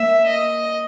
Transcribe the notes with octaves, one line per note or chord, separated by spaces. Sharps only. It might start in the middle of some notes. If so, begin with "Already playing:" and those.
Already playing: A#3 E5
D#5